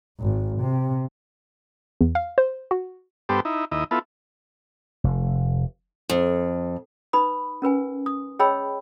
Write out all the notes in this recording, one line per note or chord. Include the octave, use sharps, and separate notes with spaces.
G#1
C3
E2
F5
C5
F#4
G2 B3 G4 A4 C5
D#4 E4
D#2 E4 D#5
B3 E4 F4 A4
F1
F2
D#4 B4 B5 D#6
C#4 A#4 B4 G#5
D#6
G#4 C#5 D#5 G5 B5 E6